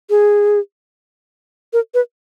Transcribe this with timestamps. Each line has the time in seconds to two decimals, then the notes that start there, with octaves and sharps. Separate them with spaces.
0.10 G#4
1.73 A#4
1.94 B4